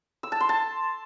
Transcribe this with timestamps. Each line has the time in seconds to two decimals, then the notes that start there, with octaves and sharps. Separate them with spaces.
0.23 E6
0.32 A5
0.40 C6
0.49 A5